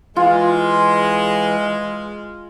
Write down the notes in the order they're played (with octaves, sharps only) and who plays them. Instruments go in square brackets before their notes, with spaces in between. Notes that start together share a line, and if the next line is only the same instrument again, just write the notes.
[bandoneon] E3 [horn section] G#3 [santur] F4